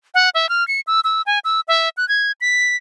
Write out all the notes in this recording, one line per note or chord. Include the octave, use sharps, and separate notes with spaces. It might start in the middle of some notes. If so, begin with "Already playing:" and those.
F#5
E5
F6
C#7
E6
E6
G#5
E6
E5
F#6
G#6
B6